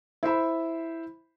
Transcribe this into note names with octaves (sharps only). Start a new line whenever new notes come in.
E4 C5 E5 B5